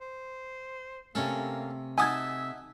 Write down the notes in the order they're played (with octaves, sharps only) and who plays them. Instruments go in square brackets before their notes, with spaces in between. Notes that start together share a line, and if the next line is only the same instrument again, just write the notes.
[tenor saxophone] C5
[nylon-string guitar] C3 A3 [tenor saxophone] A#3 [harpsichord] C#4 A4
[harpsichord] D#4 F#4 A5 [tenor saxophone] E5 [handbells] G#5 D#6 G#6